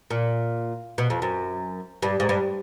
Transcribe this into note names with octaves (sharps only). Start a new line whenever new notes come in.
A#2
B2
F2
F#2
G2
G#2
G2